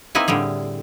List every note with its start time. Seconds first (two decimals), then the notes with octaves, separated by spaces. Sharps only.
0.15 A#3 C4 D#4 E4 B4 G#5
0.28 A2 D3 G3 G#4